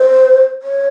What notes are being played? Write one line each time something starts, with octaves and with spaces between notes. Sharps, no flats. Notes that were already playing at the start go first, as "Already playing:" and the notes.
Already playing: C5
C#5